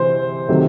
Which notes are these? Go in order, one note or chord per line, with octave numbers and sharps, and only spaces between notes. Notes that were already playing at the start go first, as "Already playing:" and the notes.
Already playing: C3 E3 C5
C3 D#3 F#3 A3